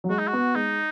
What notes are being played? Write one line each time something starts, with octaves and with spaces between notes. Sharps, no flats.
F#3
G#3 F#4
D#4
F#4
B3
G#3 D#4